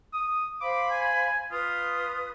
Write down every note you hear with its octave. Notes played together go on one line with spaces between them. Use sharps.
D#6
C5 F5 B5 D6
G#5
F4 B4 D#6